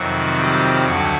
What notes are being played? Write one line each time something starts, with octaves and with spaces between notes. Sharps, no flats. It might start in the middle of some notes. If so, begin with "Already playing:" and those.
Already playing: F2 C3 D#3 F#3 F#4
G3 G4
D2 D3 F#3 F#4